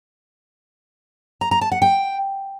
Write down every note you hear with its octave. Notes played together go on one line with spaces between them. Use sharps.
A#5
A#5
A5
F#5
G5